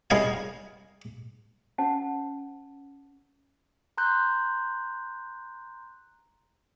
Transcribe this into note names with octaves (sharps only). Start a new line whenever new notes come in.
C2 E4 G#4 D#5 F5 G#5
C#4 C5 F#5 A5
A#5 C6 F#6 G6